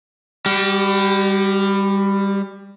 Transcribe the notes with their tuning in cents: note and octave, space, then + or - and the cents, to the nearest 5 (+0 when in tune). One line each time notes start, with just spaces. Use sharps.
G3 +20 G4 -40